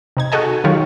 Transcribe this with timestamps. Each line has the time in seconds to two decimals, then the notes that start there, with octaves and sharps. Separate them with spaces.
0.17 C3 D#4 G#6
0.32 F#4 G#4 A4 D#5 G#5
0.64 D#3 F#3 D#4 F4 G4 C#5